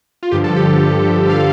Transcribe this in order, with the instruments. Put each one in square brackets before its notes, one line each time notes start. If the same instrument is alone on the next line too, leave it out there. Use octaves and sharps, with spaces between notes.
[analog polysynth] F4
G2 D3 F3 G4
A4
G4
F5